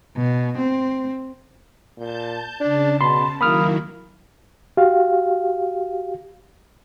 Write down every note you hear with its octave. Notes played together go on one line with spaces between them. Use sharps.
B2
C4
A#2 A5 G6
C#3 D4 A5
B2 B5 C6
D#3 F#3 A#3 E4 B5 D#6 F6
F#4 G4 F5